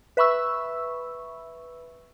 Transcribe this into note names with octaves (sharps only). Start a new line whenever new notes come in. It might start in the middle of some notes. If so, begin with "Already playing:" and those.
B4 E5 B5 C#6 E6